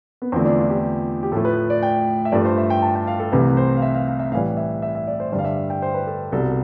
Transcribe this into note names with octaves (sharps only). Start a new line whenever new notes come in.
B3
E2 D3 F3 A3 C4
D4
F4
G4
G4
A2 F3 A3 A4
B4
D5
G5
E5
G2 F3 A3 D5
C5
E5
G5
A5
G5
F5
A4
C2 C3 E3 A3 B4
C5
F5
E5
F5
F5
E5
A2 E3 G3 F5
E5
E5
E5
D5
C5
G2 D3 G3 D5
F5
E5
G5
C5
B4
A4
C2 B2 G3 A4